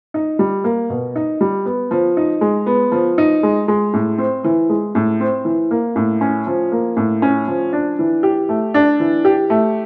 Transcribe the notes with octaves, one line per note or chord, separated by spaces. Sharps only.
D#4
G3
A#3
B2
D#4
G3
B3
F3
D#4
G#3
B3
F3
D#4
G#3
G#3
A2
C4
E3
G#3
A2
C4
E3
A#3
A2
C#4
F3
A#3
A2
C#4
F3
D4
E3
G4
A3
D4
E3
G4
A3